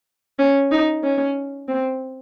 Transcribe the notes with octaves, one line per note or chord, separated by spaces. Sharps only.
C#4
D#4
C#4
C4